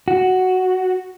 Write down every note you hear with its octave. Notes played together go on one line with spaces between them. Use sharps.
F#4